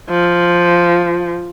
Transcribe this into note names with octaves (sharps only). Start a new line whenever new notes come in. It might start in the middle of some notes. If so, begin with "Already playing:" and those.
F3